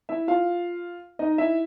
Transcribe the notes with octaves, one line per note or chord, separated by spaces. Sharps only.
E4 E5
F4 F5
D#4 D#5
E4 E5